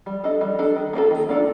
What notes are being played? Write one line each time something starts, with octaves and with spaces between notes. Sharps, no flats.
G3
D4 A4 D#5
G3
D4 A4 D#5
D#3
A#3 D4 F4 A4
D#3
A#3 D4 F4 A4